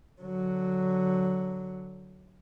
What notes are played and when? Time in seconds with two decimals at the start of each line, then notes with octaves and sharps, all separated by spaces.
0.22 D3 F#3